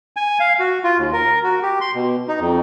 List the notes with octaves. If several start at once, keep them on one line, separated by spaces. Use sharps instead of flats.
G#5
F5
F#4
F4
D#2
A#4
F#4
G4
C6
B2
D#4
F2